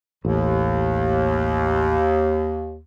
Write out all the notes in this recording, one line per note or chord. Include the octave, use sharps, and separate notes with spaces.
A1 D#2